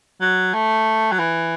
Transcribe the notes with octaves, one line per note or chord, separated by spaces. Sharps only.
F#3
A3
F#3
E3